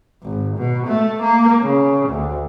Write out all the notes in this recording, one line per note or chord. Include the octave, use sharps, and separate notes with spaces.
G#1
B2
A3
A#3
C#3
D2